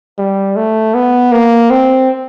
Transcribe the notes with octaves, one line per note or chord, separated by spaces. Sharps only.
G3
A3
B3
A#3
C4